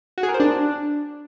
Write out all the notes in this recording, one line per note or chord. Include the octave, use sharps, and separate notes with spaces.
F#4
G#4
A#4
C5
D4